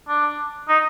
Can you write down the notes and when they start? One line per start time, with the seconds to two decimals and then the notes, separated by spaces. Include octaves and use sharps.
0.08 D4
0.68 D#4